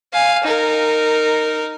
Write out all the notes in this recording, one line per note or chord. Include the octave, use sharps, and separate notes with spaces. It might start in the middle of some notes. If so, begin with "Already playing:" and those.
F5 G#5
D#4 A#4